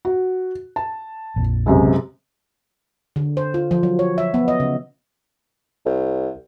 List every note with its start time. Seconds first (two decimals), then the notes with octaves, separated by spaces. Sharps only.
0.05 F#4
0.76 A5
1.36 A#1 F2
1.66 C#2 F#2 C3
3.16 D3
3.37 C5
3.54 F4
3.71 F3
3.83 F#3
3.99 C#5
4.18 E5
4.34 B3
4.48 D#5
4.60 C#3
5.86 C2